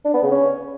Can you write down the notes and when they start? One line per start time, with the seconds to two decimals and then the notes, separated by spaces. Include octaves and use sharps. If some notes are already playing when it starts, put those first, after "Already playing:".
0.05 D4
0.14 B3
0.23 C#3
0.31 C#4